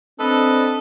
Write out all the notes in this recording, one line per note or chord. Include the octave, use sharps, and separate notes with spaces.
C4 D4 A4 B4 D#5